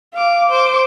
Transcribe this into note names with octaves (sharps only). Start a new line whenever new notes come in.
F5 D6
C5 D6